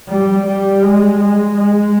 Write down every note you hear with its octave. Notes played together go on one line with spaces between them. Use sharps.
G3
G3
G#3
G#3
G#3